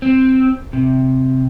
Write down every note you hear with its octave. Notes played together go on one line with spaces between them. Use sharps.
C4
C3